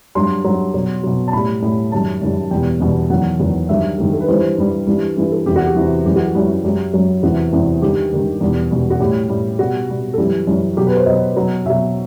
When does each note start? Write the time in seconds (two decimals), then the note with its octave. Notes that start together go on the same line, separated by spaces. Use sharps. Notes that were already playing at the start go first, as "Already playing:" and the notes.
0.15 G2 F#3 C6
0.44 G2 F#3
0.74 B2 F#3
1.03 B2 F#3
1.28 A5
1.33 A2 G3 B5
1.62 A2 G3
1.92 F#2 D#3 G3 A5
2.22 F#2 D#3 G3
2.51 E2 B2 G3 G5
2.80 E2 B2 G3
3.10 E2 D#3 F#3 F#5
3.40 E2 D#3 F#3
3.69 G2 D#3 F#3 E5
3.98 G2 D#3 F#3
4.13 A4
4.20 B4
4.28 G2 E3 G3 C5
4.58 G2 E3 G3
4.87 G2 E3 G3
5.16 G2 E3 G3 B4
5.32 A4
5.46 E2 C3 E3 G4
5.56 F#4
5.66 G4
5.76 E2 C3 E3
6.05 F#2 E3 G3 G4
6.16 F#4
6.27 G4
6.35 F#2 E3 G3
6.64 F#2 F#3 G4
6.94 F#2 F#3
7.23 E2 C3 E3 F#4
7.53 E2 C3 E3
7.82 G2 D#3 G3 G4
8.12 G2 D#3 G3
8.41 E2 B2 G3
8.71 E2 B2 G3
8.90 F#4
9.00 A2 G3 G4
9.29 A2 G3
9.59 B2 G3 F#4
9.89 B2 G3
10.13 A4
10.18 F#2 E3 G3 G4
10.47 F#2 E3 G3
10.77 B2 F#3 G4
10.87 B4
10.97 C5
11.06 B2 F#3 D#5
11.36 B2 F#3
11.66 B2 F#3 E5